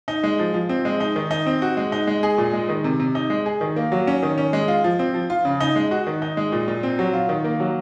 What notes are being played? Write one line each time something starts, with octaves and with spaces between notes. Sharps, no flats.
D#4
G#3
F3
F3
C4
G#3
D#4
D#3
D#4
C4
F#4
G#3
D#4
G#3
G#4
A#2
G#3
D#3
C3
C3
D#4
G#3
G#4
D#3
A#3
F#3
C#4
D#3
C#4
G#3
F4
F3
C4
F3
F4
C#3
D#4
G#3
F#4
D#3
D#4
G#3
A#2
A#2
C4
F#3
F4
D#3
A#3
F#3